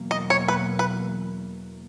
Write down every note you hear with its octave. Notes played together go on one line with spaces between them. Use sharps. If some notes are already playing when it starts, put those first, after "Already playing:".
Already playing: E2 B2 F#3 A#3
D#5
C#5
B4
B4